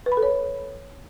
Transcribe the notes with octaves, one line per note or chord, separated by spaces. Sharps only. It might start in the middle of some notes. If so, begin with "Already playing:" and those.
B4
B5
A4
C#5